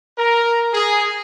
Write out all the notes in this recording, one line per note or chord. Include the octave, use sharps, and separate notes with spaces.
A#4
G#4